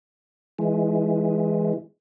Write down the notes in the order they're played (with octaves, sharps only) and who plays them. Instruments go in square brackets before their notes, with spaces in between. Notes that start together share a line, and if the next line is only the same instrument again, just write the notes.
[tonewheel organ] E3 G#3